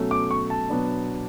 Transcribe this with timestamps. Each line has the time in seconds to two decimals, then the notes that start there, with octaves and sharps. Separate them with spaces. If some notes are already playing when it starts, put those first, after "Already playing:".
Already playing: B2 F#3 A3 C#4
0.11 D6
0.31 C#6
0.50 A5
0.70 B2 F#3 B3 D4